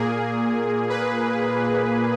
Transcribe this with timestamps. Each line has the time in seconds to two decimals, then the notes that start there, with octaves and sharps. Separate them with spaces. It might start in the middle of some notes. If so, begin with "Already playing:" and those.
Already playing: A#2 A#3 G#4
0.90 B4